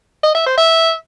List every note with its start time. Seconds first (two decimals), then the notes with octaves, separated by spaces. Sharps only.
0.23 D#5
0.35 E5
0.46 C5
0.58 E5